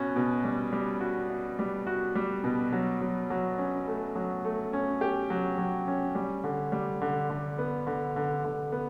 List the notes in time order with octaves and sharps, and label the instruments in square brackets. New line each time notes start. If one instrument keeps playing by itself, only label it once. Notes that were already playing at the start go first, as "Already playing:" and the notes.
Already playing: [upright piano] B2 C#4 F#4
B2
G3
G3
F#4
F#4
G3
F#4
G3
B2
F#3
F#3
F#3
C#4
A3
F#3
A3
C#4
G4
F#3
F#3
C#4
G3
D3
G3
D3
D3
B3
D3
D3
D3
B3